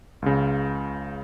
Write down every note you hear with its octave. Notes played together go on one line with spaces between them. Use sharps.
C#2 C#3